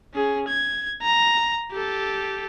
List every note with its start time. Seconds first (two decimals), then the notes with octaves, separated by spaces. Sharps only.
0.14 C#4 G#4
0.48 G#6
1.02 A#5
1.72 G4 A4